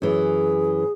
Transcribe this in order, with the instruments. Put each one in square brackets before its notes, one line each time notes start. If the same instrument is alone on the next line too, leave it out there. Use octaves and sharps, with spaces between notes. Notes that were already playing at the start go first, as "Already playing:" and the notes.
[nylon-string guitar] F#2 E3 [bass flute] G#4